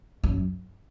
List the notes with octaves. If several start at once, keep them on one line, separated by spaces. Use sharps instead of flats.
F#2